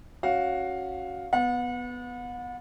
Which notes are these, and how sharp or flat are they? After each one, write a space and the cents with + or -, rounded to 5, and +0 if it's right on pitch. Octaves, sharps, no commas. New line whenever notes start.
C#4 +0 F#4 +0 F5 +10
B3 +5 F#5 -40